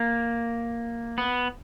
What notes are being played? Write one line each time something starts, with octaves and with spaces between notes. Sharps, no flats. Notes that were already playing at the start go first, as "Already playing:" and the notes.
Already playing: A#3
B3